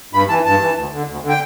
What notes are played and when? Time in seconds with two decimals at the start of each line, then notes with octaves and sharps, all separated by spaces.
0.13 G2 B5
0.29 E3 A5
0.45 G2 A5
0.61 E3
0.76 D2
0.93 D3
1.07 D2
1.23 D3
1.29 G5